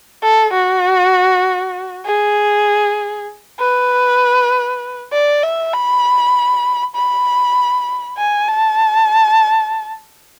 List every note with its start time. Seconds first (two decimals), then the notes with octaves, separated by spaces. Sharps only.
0.23 A4
0.54 F#4
2.06 G#4
3.60 B4
5.13 D5
5.43 E5
5.74 B5
6.96 B5
8.18 G#5
8.49 A5